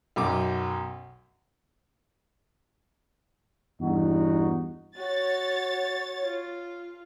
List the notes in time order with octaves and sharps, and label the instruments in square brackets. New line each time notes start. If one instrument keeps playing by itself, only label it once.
[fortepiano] B1 F#2 D6
[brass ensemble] E2 G2 D#4 F#4
[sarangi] F#4 [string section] C#5 A6
[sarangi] F4